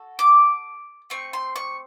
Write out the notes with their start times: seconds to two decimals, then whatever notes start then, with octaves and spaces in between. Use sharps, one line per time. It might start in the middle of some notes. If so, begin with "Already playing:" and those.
Already playing: F#4 A4
0.19 D6
1.10 A3 C4 C#6
1.33 C6
1.56 C#6